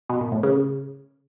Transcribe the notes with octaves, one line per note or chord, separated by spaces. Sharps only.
B2
A#2
A2
C#3